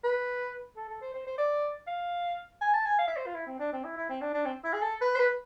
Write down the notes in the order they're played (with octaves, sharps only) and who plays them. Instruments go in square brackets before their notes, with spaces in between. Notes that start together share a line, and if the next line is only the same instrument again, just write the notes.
[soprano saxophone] B4
A4
A4
C5
C5
C5
D5
F5
G#5
A5
G#5
F5
E5
C5
F4
E4
C4
D4
C4
E4
E4
C4
D4
D4
C4
E4
G#4
A4
B4
C5
B4